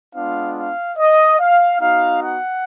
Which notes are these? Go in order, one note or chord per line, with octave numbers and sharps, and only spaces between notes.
G#3 B3 D4 F4 F5
F5
D#5
F5
B3 D#4 F#4 F5
F#5